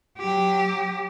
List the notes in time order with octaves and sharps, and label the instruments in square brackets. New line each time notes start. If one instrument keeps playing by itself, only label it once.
[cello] F#3 G4